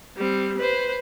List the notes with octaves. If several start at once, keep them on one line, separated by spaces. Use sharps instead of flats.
G3 C4
B4 C5